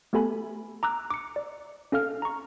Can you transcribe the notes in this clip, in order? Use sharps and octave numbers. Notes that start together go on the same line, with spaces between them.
A3 B3 G4 A4 G#5 B5
A#5 D6 E6 F#6
D6 C#7
D5
C#4 A4 F5 F6
A#5 C#6